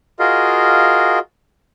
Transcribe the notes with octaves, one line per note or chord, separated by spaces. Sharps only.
F4 F#4 G#4 A#4 D#5 F5